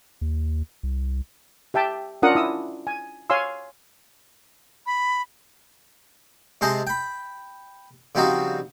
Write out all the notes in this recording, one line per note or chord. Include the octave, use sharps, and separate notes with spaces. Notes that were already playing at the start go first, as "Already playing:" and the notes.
D#2
C2
G4 E5 G5 A5
C#4 D4 F4 A#4 F#5 D#6
E4 D#6 E6
G#5
C#5 F5 G#5 C6 E6
B5
C3 G#3 C5 D#5 G#5 A5
G5 B5
C#3 F3 G3 C4 D#4 F#4